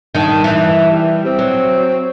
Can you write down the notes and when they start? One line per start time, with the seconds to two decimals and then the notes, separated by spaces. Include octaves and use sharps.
0.15 G2 D#3
0.44 E3
0.88 G3
1.26 C4
1.39 F#3